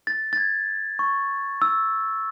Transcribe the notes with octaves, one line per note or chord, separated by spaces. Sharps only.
A6
A6
G#6
C#6
E6